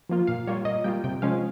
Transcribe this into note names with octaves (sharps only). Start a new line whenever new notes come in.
F3 A#3 F4
A#2 F5
G3 A#3 F4 C#5
A#2 D#5
G3 A#3 F4 G5
C3 G5
F3 G#3 C#4 F5